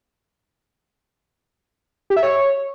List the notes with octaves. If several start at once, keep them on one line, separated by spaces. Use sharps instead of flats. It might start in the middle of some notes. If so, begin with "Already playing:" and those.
G4
E5
C#5